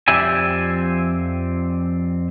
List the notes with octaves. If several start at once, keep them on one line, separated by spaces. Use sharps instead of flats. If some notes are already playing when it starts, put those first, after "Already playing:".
F2 C4 G4 D5 E5 G#5